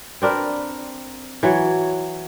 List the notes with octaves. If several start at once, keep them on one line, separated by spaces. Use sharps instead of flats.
C4 D4 A#4 B4
E3 F#3 C#5